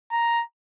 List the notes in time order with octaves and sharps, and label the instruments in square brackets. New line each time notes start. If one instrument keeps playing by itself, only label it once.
[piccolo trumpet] A#5